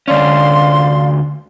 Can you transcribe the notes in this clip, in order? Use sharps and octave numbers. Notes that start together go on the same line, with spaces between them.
D2 C#4 D5 F5 C6